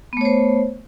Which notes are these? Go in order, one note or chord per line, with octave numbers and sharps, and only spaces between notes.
A3 B3 C5 C#5